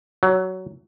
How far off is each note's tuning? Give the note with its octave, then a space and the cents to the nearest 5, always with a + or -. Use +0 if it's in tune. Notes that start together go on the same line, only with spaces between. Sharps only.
F#3 +15